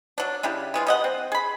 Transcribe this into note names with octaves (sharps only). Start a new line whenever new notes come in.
F#3 D4
C#3 D4 E4 G4
E3 G#3 F4
G3 D#5 F#5
C4
G#4 B5